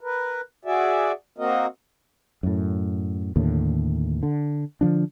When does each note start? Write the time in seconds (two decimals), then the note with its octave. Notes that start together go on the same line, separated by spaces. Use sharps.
0.01 A#4 B4
0.65 F#4 G#4 D5 E5
1.38 A#3 C4 F#4 A#4 D#5
2.43 F#2 A2
3.36 D#2 A2 D3
4.23 D3
4.81 D3 F3 D4